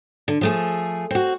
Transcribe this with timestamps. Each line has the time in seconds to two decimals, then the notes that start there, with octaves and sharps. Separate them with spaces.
0.28 D3
0.41 F3 A3 G#4
1.11 C4 F#4